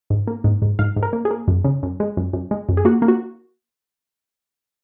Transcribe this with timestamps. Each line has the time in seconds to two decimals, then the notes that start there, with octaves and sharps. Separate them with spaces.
0.10 G#2
0.27 A#3
0.44 G#2
0.62 G#2
0.79 G#2 F5
0.96 G#2
1.03 A#4
1.13 A#3
1.25 G#4
1.31 A#3
1.48 F#2
1.64 C#3
1.83 F#2
2.00 G#3
2.17 F#2
2.33 F#2
2.51 G#3
2.69 F#2
2.77 G#4
2.85 A#3 F#4
3.02 A#3
3.08 F#4